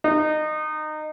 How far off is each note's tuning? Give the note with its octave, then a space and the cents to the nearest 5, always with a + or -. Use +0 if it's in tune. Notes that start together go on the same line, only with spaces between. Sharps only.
D#4 -20